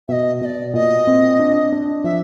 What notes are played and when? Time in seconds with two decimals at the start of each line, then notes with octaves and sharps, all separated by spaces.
0.08 B2 D#5 E5
0.41 B2 D#5
0.45 D5
0.74 A#2 D#5
1.07 C4
1.39 D4
1.72 D4
2.04 F3 E5